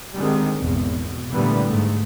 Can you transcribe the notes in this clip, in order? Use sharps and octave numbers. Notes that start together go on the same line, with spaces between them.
D3 D#3 G3 G#3 C4
G#1 E2 B2
B2
A#2 D3 E3 G3 A3 B3
G#2 A3